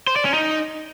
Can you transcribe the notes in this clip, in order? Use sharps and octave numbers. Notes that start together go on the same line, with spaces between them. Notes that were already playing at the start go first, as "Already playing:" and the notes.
C5
D5
C#4
D#4